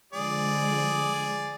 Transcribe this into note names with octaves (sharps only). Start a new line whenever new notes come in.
D3 F3 G#3 G#4 D5